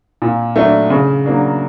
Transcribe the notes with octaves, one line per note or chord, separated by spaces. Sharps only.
A#2
F#3 A3 D4
C#3
F#3 A#3 D4